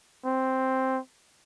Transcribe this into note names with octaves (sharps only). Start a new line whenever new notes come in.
C4